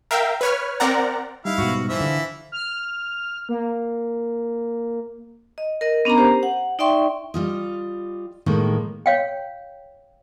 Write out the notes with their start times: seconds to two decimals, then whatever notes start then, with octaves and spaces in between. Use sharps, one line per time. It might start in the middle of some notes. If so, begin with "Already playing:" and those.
0.11 A#4 E5 F5 G5
0.41 B4 C#5 F6
0.80 C4 A#4 D5 F#5 A#5
1.45 G3 D#4 E4 F5
1.58 G#2 B2 F#4
1.89 E3 F3 E5
2.00 D3
2.52 F6
3.49 A#3
5.58 D#5
5.81 A#4 D#5
6.05 B3 C#4 D4 A#4 A#5
6.18 G4 C5
6.43 F#5
6.79 D#4 D5 E5 G5 C6 C#6
7.34 G3 F4 D#5
8.46 A2 D#3 E3 G#3 A#3
9.06 C#5 F5 G5